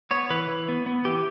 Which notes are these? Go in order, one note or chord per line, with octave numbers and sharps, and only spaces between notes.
B3 C#5
E3 B4
E3
B3
B3
E3 G4